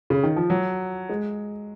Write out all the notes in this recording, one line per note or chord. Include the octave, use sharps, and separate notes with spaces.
C#3
D#3
F3
F#3
G#3